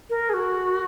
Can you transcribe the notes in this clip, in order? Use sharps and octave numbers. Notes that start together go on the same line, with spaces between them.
A#4
G#4
F#4